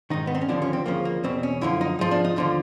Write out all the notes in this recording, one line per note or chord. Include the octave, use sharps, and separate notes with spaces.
G#2 D#3 D#4
B3
C4
C#4
D#2 D3 F3 D4
C#4
C4
D2 C#3 F3 A#3
A#3
E2 B2 C4
C#4
F#2 D3 F3 E4
D#4
G#2 F3
D4
D#4
D#2 D3 F3 F4